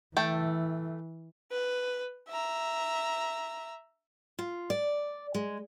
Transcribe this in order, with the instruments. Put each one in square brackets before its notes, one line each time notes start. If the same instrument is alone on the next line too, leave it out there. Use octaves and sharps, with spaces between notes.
[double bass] E3 [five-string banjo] A3 G5 A5
[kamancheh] B4
E5 A#5
[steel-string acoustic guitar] F4
D5
G#3